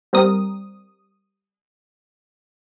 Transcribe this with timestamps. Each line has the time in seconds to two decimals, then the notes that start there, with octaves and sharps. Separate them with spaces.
0.13 G3 C4 A#4 D#6